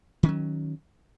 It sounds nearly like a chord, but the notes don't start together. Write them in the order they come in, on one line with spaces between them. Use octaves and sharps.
D#3 C#4 F#3